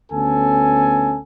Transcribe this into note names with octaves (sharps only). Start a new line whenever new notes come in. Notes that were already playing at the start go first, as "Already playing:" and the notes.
D2 B3 C#4 A4 G#5